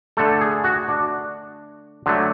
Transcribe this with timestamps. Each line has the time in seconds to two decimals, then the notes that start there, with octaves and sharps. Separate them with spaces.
0.17 D3 A3 A4
0.41 G#4
0.64 F#4
0.88 D4
2.06 D3 F#3 A3